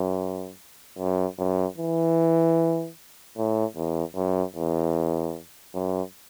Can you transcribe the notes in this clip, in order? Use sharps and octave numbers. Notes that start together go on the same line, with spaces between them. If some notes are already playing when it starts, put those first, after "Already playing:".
Already playing: F#2
F#2
F#2
E3
A2
E2
F#2
E2
F#2